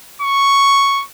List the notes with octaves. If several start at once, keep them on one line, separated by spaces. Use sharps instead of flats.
C#6